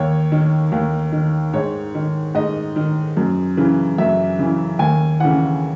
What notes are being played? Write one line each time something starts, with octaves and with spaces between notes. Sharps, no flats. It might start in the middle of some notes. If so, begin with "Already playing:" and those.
Already playing: D#2 C#5
D#3
D#2
D#3
G#2 C#5
D#3
G#2 D#5
D#3
F#2
C#3 E3
F#2 E5
C#3 E3
D#2 G#5
C#3 E3 F#5